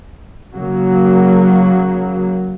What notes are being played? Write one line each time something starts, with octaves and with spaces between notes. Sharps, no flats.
C#3 F#3 A#3